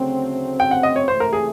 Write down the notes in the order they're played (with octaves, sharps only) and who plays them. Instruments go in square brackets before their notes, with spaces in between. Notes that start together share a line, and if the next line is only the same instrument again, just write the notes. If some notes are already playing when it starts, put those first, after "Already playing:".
Already playing: [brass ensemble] D2 C#3 F#3 A3 C4
[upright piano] G5
F#5
D#5
C#5
[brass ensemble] C#2 C3 E3 A3 [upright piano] C5
[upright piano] A#4
G#4